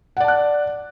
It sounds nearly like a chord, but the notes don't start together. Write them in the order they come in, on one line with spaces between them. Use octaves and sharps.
F#5 D5 A5 F#6